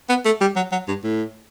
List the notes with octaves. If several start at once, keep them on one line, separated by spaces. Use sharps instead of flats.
B3
A3
G3
F#3
F#3
G2
A2